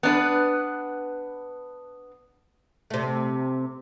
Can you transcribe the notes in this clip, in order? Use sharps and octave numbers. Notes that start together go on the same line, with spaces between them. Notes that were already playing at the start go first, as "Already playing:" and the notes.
B3 D4 B4
C3 A3